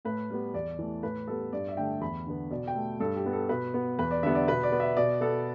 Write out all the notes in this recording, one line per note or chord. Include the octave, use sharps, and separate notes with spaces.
A2 B4
G3 B3
E2 D5
E3 A3
A2 B4
G3 B3 A4
G2 D5
E5
D3 A3 G5
E2 B5
D3 B3
B2 D5
G5
A3
G2 A4
G4
G3 B3
A4
B2 B4
B3
E2 B4
D5
D3 G3 B3 E5
D5
B2 B4
D5
B3
E5
B2 D5
B3 A4